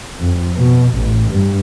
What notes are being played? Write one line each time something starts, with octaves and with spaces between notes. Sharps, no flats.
F2
B2
A1
G2